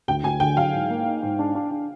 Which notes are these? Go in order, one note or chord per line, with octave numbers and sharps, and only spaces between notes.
D2 G5
D2 G#5
D3 G5
F#3 F5
G#2
A#3
D#4
G#2
D4
D4
D4